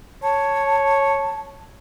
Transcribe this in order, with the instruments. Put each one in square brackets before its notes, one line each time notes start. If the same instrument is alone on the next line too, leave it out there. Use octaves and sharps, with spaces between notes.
[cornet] C#5 [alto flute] A5